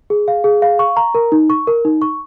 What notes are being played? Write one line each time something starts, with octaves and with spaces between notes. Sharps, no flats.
G#4
F5
G#4
F5
C#6
A#5
A#4
D#4
C#6
A#4
D#4
C#6